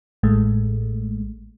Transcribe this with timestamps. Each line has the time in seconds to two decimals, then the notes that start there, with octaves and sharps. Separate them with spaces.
0.23 A1 A2 G#3 A3